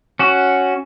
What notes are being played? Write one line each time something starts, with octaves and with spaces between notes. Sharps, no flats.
C#4 F#4